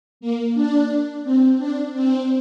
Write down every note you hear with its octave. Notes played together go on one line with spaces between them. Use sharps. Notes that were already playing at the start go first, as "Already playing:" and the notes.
A#3
D4
C4
D4
C4